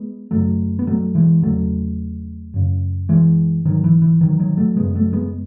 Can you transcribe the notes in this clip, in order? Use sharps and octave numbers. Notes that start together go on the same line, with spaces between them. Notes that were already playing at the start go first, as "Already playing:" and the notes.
Already playing: G#3 B3
F#2 C#3 F#3 A3
B3
F#3 A3
E3 G#3
E2 C#3 F#3 A3
F#2 C#3
E3 G#3
G#2 D#3 F#3
E3
E3
D#3 F#3
D#3 F#3
F#3 A3
F#2 C#3 G#3 B3
F#3 A3
G#3 B3